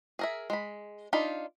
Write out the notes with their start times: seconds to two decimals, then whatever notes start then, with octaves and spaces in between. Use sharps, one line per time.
0.19 G#4 A#4 E5
0.50 G#3 B5
1.13 D4 D#4 F4 B5